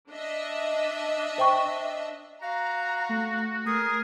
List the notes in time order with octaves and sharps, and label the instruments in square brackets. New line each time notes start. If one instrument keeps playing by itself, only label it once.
[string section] D4 D#5 E5
[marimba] C5 G5 C#6
[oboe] F#4 [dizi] F5 [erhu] A#5
[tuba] A3
[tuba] A3 [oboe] G#4 [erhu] A#4 [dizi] D#6